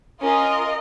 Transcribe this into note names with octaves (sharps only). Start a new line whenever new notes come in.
C#4 F4 A#4 D#5